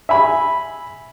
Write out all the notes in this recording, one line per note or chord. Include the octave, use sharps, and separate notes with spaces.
E5 G#5 B5